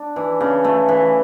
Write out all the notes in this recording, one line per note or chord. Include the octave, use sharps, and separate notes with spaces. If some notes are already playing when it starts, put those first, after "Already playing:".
Already playing: D4
E3
C#3
A3
E3